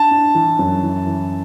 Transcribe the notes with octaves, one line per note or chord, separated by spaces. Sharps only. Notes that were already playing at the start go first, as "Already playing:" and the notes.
Already playing: D4 A5
D4
E3
F#2
E3
E3